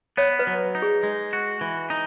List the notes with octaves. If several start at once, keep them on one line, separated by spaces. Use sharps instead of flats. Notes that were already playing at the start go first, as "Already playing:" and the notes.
B3 C#5
B4
F#3
D#4
G#4
G#3
F#4
E3
D#4